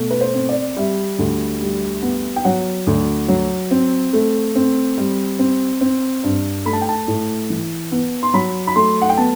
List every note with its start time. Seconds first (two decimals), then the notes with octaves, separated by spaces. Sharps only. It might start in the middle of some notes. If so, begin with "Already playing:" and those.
Already playing: B2 A3
0.11 B4
0.21 C5
0.34 C4
0.49 D5
0.77 G3 E5
1.19 D2
1.61 G3
2.02 B3
2.36 G5
2.45 F#3 F#5
2.87 D2
3.28 F#3
3.71 C4
4.13 A3
4.55 C4
4.98 G3
5.39 C4
5.81 C4
6.23 G2
6.65 A3 B5
6.73 A5
6.81 G5
6.89 A5
7.08 A2
7.50 E3
7.92 B3
8.23 C6
8.34 F#3 B5
8.67 B5
8.76 A3 C6
9.02 F#5
9.09 G5
9.17 B3 A5